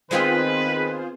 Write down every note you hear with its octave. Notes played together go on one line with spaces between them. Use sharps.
D#3 G#3 B3 C4 F4 G#4 B4 C5